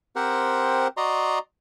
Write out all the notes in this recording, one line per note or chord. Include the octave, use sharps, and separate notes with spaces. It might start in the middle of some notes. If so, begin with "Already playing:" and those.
C4 G4 A#4 C5 F#5
F#4 D5 D#5 A#5 C6